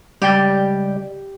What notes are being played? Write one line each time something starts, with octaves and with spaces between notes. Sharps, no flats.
C#2 G3 G4 D5 G5